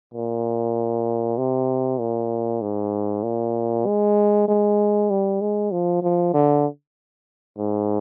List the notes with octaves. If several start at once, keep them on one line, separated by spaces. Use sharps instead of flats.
A#2
C3
A#2
G#2
A#2
G#3
G#3
G3
G#3
F3
F3
D3
G#2